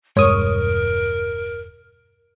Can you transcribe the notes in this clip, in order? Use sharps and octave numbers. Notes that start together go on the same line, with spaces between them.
E1 G2 G#3 A#4 C#5 D#6